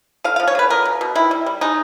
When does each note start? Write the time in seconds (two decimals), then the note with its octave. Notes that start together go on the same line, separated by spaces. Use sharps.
0.24 D3 F5
0.36 F5
0.40 F3
0.48 C#5
0.55 D3 B4
0.70 B3 A#4
0.85 B2
1.01 B2
1.15 D#3 E4
1.31 G3
1.46 G3
1.61 G#3 D#4